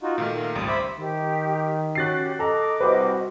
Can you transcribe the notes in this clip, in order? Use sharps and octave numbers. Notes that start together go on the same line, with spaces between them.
D#4 F4 F#4
A#2 D#3 A3 F5
A#4 F5
G#1 C#2 G3 D#6
C5 E5 B5 D6
D#3 G4
C#4 F#4 G4 F#6 A6 C7
A4 D#5 A#5 D6
C2 C3 F#4 B4 C5